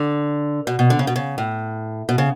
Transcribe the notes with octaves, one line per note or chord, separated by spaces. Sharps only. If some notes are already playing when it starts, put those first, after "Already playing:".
Already playing: D3
B2
B2
D3
C#3
B2
C#3
A2
B2
C#3